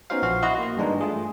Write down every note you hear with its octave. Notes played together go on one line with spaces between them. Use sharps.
B3 C#4 D#4 F#4 C5 F5
A#1 F3 F#4 F5
E4 F#4 D#5 C6
A#3 F#4
G2 E3 G#3 D4 D#4
A3 F4 G#4